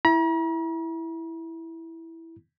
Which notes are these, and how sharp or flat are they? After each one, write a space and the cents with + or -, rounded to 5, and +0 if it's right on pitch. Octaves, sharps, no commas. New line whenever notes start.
E4 +0 A#5 +45